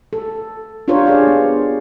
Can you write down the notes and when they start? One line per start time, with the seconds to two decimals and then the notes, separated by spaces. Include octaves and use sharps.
0.13 A4
0.88 D4 F4 G4 A#4 C5 C#5
1.06 G#4 D5 F5
1.27 B3